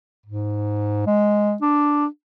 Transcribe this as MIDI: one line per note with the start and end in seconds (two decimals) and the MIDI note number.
0.26 1.03 44
1.07 1.55 56
1.62 2.06 62